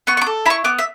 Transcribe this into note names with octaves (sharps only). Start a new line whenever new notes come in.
B3 C#6
C#6
D6
A4
E4 B5 C#6
B3 D6
E5